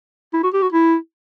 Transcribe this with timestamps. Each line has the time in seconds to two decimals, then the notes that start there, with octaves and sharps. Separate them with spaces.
0.33 E4
0.44 F#4
0.54 G4
0.62 F#4
0.72 E4